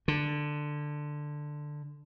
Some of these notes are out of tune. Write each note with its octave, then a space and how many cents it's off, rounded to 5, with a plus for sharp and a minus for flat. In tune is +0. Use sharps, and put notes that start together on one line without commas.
D3 +10